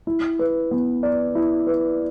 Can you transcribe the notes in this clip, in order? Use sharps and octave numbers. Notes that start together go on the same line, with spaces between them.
E4
B4
B3
D5
E4
B4